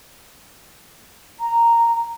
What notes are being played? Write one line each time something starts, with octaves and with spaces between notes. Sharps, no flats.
A#5